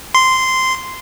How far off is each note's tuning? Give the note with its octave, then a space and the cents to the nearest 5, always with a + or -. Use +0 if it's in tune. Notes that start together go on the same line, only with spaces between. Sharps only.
C6 -10